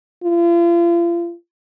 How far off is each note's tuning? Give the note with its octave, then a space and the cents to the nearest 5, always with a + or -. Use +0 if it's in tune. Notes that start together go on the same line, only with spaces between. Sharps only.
F4 -40